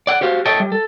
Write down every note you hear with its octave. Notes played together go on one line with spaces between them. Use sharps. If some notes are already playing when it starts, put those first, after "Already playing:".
D5 F#5
F#4 G4 C5 F5
A4 C#5 D#5 E5 G5 A5
G3
A4